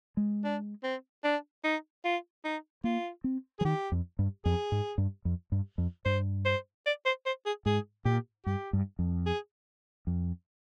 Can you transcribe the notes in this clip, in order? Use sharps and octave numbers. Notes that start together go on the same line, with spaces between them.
G#3
D4
C4
D4
D#4
F4
D#4
A#3 F4
C4
F3 G#4
D#3 G4
F2
G2
F2 G#4
G#2
G2
F2
G2
F2
G2 C5
C5
D5
C5
C5
G#4
G#2 G#4
A#2 G4
G2 G4
G2
F2
G#4
F2